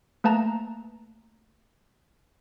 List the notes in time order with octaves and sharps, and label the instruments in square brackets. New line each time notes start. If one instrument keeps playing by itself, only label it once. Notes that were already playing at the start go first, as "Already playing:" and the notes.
[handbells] A3 A#3 B4 A5 A#5